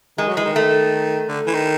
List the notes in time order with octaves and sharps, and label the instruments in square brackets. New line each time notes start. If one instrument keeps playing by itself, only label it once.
[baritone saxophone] D#3 [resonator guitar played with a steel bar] G#3
[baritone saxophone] F#3
[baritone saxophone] E3 [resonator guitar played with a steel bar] G#3
[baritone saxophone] D#3
[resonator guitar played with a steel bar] A3
[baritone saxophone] D3
E3
D#3